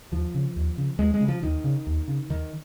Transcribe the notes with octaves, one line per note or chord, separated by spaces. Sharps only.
D#2 F3
C#3
D#2
C#3
D#2 G#3
G#3
C#3
F3
D#2 D#3
C#3
D#2
C#3
D#2 D#3